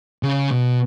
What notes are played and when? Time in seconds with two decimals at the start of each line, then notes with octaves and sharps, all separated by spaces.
0.23 C#3
0.51 B2